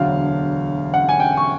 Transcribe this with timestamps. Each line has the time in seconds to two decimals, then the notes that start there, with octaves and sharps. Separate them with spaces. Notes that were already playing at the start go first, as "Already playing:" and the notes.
Already playing: E1 D2 D3 F#3 F5
0.94 F#5
1.09 G#5
1.20 G5
1.37 C#6